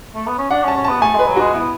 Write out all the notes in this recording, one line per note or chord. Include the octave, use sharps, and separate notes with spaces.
A3
B3
C#4
D4 F#5
C#4
A5
C#4
B3 A5
A3 G#5
G#3 B4
F#3
G#3 F#4
B3 E4